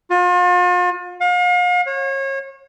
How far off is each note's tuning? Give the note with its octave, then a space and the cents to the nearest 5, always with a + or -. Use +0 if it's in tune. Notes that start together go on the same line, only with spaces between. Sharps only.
F4 +40
F5 +40
C#5 -30